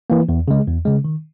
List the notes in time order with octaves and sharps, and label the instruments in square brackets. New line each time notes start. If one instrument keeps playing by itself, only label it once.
[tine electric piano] E3 A#3
E2
C#3 G#3
E2
C#3 G#3
D#3